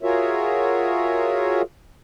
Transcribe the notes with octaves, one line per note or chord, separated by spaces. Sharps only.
F4 F#4 G#4 A#4 C#5 E5